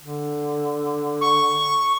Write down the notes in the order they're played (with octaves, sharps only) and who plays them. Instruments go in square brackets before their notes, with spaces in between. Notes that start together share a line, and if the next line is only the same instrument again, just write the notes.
[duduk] D3
[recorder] C#6